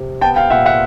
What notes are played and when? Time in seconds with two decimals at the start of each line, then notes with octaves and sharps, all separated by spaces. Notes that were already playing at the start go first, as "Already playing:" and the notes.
Already playing: C3
0.21 B3 G5 A5
0.36 F5 G5
0.50 A#2 E5 F#5
0.66 E5 F#5